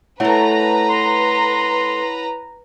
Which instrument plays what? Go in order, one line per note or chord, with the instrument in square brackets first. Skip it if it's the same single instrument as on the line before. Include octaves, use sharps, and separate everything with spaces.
[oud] A3 A4 [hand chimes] E4 C#5 F#5 [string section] B4 A#5
[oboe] C6